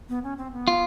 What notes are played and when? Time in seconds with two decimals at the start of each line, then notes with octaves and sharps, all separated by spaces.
0.09 B3
0.23 C#4
0.38 C4
0.52 B3
0.68 F4